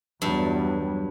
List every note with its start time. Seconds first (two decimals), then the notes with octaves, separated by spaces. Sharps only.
0.22 E2 G2 F#3 G3